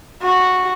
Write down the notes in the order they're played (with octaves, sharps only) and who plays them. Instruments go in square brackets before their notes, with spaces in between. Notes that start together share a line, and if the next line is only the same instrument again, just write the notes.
[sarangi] F#4